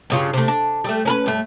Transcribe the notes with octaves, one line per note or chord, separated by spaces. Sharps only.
G2 C#3 F4
C3 A3
D4
G3 A3
C#4 A#4 B4
G2 A3